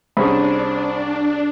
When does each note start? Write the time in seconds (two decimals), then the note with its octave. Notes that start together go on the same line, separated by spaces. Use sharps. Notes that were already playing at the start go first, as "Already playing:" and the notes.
0.17 C2 C#4 D4 G#4 C5 B5